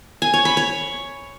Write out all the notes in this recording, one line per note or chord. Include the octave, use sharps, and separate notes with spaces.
G#5
C#5
B5
C#5